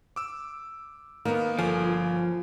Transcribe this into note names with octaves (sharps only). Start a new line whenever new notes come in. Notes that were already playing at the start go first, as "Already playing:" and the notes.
D6 E6
D#3 A#3 B3
G1 F3 A4 G#5 D7
F4